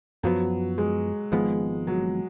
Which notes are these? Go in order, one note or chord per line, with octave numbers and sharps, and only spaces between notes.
F#2 F3 F#3 B3
G#3
G#1 G#2 F3 G#3 B3
F#3